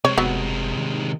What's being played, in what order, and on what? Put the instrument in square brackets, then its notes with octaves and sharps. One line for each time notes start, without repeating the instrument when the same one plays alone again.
[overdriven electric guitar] C3 G#3 [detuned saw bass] C4 [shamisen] C#5
[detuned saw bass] F1 [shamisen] F#3 B3
[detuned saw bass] D#3